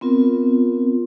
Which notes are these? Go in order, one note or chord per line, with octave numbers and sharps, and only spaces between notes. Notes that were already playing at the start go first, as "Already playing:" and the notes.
B3 C4 F4 A#4